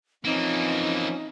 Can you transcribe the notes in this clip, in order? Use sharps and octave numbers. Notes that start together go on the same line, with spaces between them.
E3 F3 A#3 C4 C#4 D#4